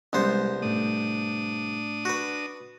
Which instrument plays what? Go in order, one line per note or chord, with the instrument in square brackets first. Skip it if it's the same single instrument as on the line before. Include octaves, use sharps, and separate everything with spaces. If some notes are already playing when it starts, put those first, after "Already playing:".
[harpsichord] C2 B3 C5 [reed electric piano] G3 G#3 C#4
[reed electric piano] A2 A3 [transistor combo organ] D4 D#6
[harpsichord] F#4 B4